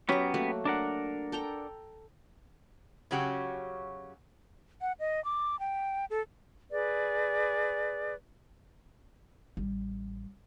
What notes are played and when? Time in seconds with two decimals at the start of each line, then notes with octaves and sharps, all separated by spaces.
0.09 F#3 B3 C#4 G4 A#5
0.34 A3 A#3 F#4
0.65 D4 A#4 F#5
1.32 A4 G5 A#5
3.11 C#3 F#3 C#4 F#4 G4
4.81 F#5
5.00 D#5
5.25 D6
5.60 G5
6.10 A4
6.71 G#4 B4 D5
9.57 A1 G3